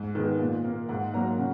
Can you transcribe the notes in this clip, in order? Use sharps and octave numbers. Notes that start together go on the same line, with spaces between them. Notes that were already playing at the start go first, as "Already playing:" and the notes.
Already playing: G#2
D#3 G#3 B3
A#2
A#3
G#2 F#5
F#3 A#3 A#5
C#3